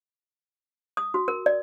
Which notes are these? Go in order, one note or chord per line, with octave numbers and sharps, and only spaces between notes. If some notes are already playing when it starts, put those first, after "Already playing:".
D#6
F#4
A#4
D5